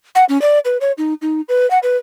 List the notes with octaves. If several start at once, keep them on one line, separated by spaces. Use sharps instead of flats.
F#5
C#4
D5
B4
C#5
D#4
D#4
B4
F#5
B4